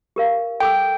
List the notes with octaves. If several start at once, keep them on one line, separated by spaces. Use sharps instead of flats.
G4 A#4 F5
A4 G5 D6 E6